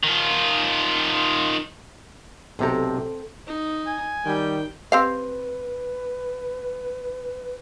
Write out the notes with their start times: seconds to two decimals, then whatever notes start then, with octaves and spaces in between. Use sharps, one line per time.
0.03 D#3 F4
2.59 B1 C3 C4 A4 A#5
3.47 D#4
3.86 G#5
4.25 D#3 G3 G5
4.92 C4 G4 B4 F5